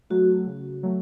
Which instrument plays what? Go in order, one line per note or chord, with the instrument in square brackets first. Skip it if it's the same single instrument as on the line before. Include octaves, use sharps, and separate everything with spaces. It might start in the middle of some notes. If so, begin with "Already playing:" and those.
[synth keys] F#3 A3 [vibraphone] F#4
[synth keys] C#3
F#3 A3